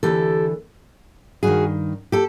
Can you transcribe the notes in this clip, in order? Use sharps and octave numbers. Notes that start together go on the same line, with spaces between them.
D2 C3 E3 G4 A4
G2 D#3 F#4 G#4
G4 A4